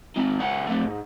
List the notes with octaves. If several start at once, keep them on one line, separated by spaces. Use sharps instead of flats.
C4 D#4
C#2 F#5
A3 C4
G#2